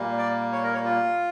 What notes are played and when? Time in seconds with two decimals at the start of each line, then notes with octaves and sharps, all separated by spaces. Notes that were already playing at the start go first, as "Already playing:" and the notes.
Already playing: A#2 G3 A#3
0.18 D5
0.52 C#5
0.63 A#4
0.74 C#5
0.85 F4